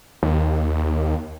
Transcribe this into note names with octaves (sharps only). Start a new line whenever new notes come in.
D#2